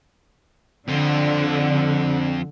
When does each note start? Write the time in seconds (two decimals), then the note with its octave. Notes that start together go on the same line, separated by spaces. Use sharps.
0.88 F2 D3 C4